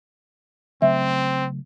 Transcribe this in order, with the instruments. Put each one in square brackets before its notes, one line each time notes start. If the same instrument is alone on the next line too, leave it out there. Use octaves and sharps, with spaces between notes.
[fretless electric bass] C#3 F#3 A3 [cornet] C4 [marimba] E5